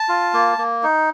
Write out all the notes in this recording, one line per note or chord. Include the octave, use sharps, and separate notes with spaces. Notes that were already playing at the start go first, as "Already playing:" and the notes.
Already playing: A5
F4
A#3
A#3
D#4